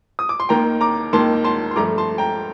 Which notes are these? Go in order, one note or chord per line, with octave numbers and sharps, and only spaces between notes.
D#6
D6
C6
D#2 D#3 A#3 G5 A#5
A#5 D6
D#2 D#3 A#3 A5 C6
A5 C6
C6
G2 F3 A3 A#5 D6
A5 C6
G5 A#5